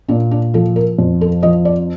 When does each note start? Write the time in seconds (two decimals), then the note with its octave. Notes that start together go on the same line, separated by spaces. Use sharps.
0.08 A#2 D4
0.31 D4
0.54 F3 A4
0.76 A#4
0.99 F2
1.21 A4
1.43 F3 D#5
1.65 D5